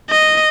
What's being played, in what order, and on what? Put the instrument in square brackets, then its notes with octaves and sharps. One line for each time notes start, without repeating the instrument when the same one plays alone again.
[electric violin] D#5